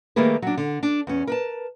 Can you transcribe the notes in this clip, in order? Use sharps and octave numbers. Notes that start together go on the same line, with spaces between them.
D#3 G3 A3 A#3 G#4 B4
F#3 D4
D3
D4
E2 C#4
A#4 B4 A5